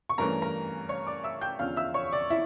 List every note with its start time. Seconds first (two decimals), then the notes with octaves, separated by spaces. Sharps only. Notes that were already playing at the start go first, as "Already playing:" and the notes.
0.09 C#6
0.18 G2 E3 A3 C#4 A#4 A#5
0.42 A#4 A#5
0.89 C#5 C#6
1.07 D5 D6
1.24 E5 E6
1.41 G5 G6
1.59 E2 D3 F3 C#4 F5 F6
1.77 E5 E6
1.94 C#5 C#6
2.13 D5
2.30 E4 E5